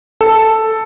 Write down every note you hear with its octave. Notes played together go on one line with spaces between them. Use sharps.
A4